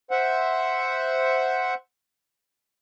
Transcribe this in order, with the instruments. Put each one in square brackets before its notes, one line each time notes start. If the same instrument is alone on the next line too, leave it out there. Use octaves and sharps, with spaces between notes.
[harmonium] C5 E5 F#5